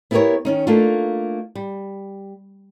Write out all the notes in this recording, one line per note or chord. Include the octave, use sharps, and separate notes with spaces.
B3 E4 G4 G#4 A#4 C#5
D#3 C#4 D#4
A3 A#3 D4 D#4 F4
G3